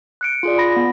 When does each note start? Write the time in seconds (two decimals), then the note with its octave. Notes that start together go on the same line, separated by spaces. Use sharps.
0.21 F#6 C#7 D7
0.43 F4 G#4 D5
0.58 B5 A#6
0.76 B3